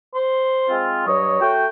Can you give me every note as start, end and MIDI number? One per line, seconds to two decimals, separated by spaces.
0.15 0.87 72
0.69 1.04 56
0.69 1.04 60
0.69 1.04 65
1.05 1.40 43
1.05 1.40 54
1.05 1.51 73
1.05 1.40 75
1.40 1.66 57
1.40 1.66 66
1.40 1.66 79